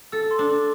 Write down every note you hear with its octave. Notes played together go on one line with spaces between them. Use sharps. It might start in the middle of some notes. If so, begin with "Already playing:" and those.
A4 E6
C6
D4 D6